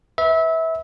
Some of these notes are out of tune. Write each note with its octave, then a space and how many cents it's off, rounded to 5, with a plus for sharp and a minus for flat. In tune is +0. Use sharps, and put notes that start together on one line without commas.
B4 +5 E5 -25